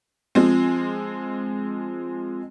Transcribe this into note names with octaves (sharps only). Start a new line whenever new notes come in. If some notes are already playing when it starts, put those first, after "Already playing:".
F3 G#3 C4